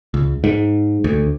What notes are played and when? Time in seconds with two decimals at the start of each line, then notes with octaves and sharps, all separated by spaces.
0.14 C#2
0.44 G#2
1.04 D2